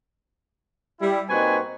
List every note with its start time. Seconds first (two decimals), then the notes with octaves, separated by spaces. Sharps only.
1.01 G3 E4
1.29 A#2 C4 D#4 F#4 B4 G#5